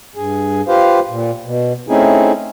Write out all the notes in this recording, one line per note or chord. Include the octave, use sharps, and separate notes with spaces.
G2 G#4
F4 G4 B4 C5 F5
A#2
B2
A3 C4 C#4 D#4 E4 G#4